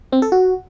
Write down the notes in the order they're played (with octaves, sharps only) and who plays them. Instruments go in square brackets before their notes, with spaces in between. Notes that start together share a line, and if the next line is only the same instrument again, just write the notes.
[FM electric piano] C4
A4
F#4